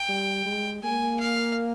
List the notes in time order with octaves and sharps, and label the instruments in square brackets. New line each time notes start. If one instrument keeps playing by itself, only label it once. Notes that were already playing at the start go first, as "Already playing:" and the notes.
Already playing: [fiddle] G5
[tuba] G3
G#3
[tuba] A#3 [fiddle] G#5
[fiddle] F5